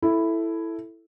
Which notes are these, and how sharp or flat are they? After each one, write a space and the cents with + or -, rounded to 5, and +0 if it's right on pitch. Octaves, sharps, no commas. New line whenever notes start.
E4 +0 A4 +0